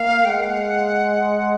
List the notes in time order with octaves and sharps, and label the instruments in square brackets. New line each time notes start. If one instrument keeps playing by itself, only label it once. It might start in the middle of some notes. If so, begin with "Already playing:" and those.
Already playing: [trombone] A#3 [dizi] F5
[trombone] G#3 [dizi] F#5 G5